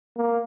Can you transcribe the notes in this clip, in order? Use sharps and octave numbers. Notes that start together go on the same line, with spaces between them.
A#3